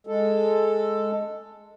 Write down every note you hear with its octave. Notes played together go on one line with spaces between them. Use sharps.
G#3 A4